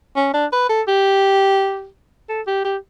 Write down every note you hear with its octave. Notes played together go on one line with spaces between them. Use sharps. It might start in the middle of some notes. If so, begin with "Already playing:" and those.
C#4
D4
B4
A4
G4
A4
G4
G4